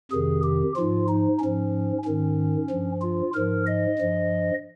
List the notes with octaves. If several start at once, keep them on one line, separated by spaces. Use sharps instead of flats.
F2 C3 D#3 G#4
G4
G#2 F3 F4
D#4
G#2 F3 C#4
G#2 D#3 C#4
G2 F3
F4
G#2 F3 A#4
D#5
G2 F3